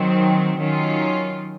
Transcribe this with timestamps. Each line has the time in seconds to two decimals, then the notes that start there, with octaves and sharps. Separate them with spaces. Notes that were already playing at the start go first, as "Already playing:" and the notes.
Already playing: D#3 F#3 C4
0.60 D#3 F#3 C#4 F4